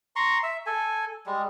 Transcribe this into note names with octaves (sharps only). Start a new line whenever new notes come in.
A#5 C6 C#6
E5
A4 G#5
G3 G#3